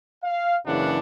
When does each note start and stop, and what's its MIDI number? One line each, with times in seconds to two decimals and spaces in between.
0.23 0.56 77
0.66 0.99 30
0.66 0.99 42
0.66 0.99 49
0.66 0.99 52
0.66 0.99 62
0.66 0.99 78